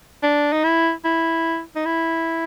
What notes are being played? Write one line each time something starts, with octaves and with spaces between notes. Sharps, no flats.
D4
D#4
E4
E4
D#4
E4